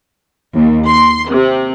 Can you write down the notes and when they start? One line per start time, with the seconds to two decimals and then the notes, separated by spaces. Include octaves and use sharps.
0.55 D#2
0.86 C6
1.29 C3